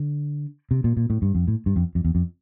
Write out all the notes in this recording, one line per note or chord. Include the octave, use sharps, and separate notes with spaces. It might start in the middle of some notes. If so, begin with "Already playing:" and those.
Already playing: D3
C3
A#2
A#2
A2
G2
F2
A2
G2
F2
F2
E2
F2